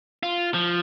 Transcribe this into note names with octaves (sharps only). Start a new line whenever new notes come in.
F4
F3